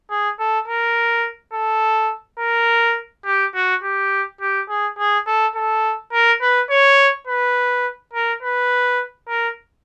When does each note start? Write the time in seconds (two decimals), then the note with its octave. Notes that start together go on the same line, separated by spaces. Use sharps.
0.10 G#4
0.39 A4
0.68 A#4
1.53 A4
2.39 A#4
3.26 G4
3.55 F#4
3.83 G4
4.41 G4
4.69 G#4
4.98 G#4
5.27 A4
5.55 A4
6.12 A#4
6.41 B4
6.70 C#5
7.27 B4
8.13 A#4
8.43 B4
9.29 A#4